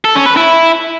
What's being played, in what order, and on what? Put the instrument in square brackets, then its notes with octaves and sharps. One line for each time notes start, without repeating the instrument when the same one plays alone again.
[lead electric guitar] A4
C#4
B4
E4